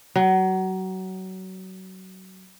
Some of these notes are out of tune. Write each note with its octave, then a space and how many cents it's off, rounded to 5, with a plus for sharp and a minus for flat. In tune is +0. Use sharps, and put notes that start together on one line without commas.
F#3 +25